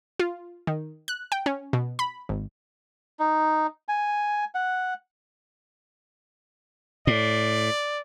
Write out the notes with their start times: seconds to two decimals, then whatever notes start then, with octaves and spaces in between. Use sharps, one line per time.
0.20 F4
0.67 D#3
1.08 F#6
1.32 G5
1.46 C#4
1.73 B2
1.99 B5
2.29 G#1
3.19 D#4
3.88 G#5
4.55 F#5
7.07 A2 D5